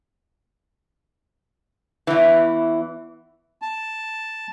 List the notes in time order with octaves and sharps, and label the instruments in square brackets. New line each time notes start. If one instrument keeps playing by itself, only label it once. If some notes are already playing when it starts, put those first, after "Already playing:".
[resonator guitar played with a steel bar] E2 E3
[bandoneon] A5